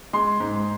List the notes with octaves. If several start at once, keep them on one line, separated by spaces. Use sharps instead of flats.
G#3 C6
G#2